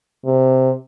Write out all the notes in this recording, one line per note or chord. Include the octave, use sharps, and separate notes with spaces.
C3